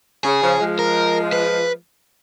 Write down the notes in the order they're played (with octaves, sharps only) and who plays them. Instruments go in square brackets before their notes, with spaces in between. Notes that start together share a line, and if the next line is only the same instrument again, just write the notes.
[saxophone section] C#3 [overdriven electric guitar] G#4
[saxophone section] C#3 F3
F3 G#3
[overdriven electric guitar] A#4
B4